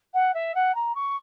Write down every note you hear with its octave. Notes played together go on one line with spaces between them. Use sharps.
F#5
E5
F#5
A#5
C#6